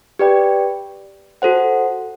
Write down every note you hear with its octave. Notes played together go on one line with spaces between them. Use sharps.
G4 B4 D5 G5
F#4 A4 C5 F#5